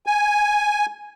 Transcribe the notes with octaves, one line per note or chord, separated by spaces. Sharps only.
G#5